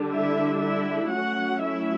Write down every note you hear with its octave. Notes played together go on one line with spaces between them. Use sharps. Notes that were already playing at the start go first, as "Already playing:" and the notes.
Already playing: D3 G3 D4
E4 E5
E4 E5
F#3 A3 C#4 F#4 F#5
E4 E5